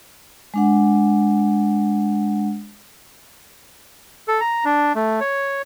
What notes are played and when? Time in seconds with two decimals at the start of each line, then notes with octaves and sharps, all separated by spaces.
0.54 G#3 D4 F#5
4.28 A4
4.41 A#5
4.65 D4
4.95 A3
5.20 C#5